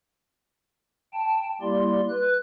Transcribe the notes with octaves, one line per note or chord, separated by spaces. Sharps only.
G5 A5
G3 A#3 E4 G4 D5 C6
B4 F#6